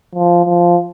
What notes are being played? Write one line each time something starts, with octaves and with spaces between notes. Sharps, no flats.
F3
F3